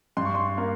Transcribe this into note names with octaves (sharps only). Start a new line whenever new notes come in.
G2 C6
C#6
C6
A#3